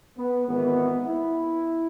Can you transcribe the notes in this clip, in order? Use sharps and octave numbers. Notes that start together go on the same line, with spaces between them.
B3
G#1 G#2 E3 B3
E4